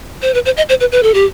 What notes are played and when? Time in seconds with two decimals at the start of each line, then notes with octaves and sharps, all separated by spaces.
0.22 C5
0.34 B4
0.46 C5
0.57 D#5
0.69 C5
0.80 B4
0.92 B4
1.03 A4
1.14 G4